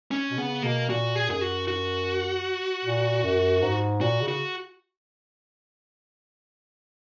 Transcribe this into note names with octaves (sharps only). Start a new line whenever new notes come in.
C#4
B2
C#3 B3
B2 A#3
A#2 F#4
G#4
F#2 G#4
F#4
F#4
A#2
F#2
G#2
A#2 F#4
C#3
F#4